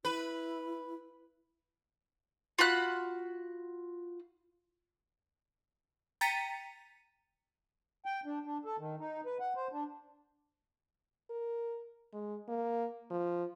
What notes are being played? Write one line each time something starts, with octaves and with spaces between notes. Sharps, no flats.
E4 B4
F4 F#4 B5 F#6
G5 A#5 A6 B6 C#7 D#7
G5
D4
D4
A4
D#3
D#4
B4
F#5
C5
D4
A#4
G#3
A#3
F3